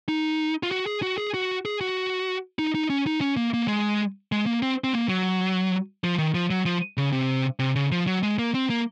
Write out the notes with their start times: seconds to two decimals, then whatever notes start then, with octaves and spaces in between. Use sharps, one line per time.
0.09 D#4
0.63 F4
0.71 F#4
0.87 G#4
1.03 F#4
1.18 G#4
1.34 F#4
1.65 G#4
1.81 F#4
2.59 D#4
2.75 D#4
2.90 C#4
3.07 D#4
3.21 C#4
3.37 A#3
3.54 A#3
3.68 G#3
4.32 G#3
4.46 A#3
4.62 C4
4.84 C4
4.94 A#3
5.09 F#3
6.04 F3
6.18 D#3
6.34 F3
6.50 F#3
6.66 F3
6.97 C#3
7.12 C3
7.59 C3
7.76 C#3
7.92 F3
8.07 F#3
8.23 G#3
8.39 A#3
8.54 C4
8.70 A#3